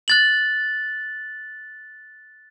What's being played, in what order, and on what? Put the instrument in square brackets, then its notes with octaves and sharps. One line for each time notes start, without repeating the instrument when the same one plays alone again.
[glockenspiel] F#6 A6 F#7